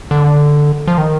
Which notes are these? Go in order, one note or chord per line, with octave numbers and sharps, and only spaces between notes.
D3
F3
D#3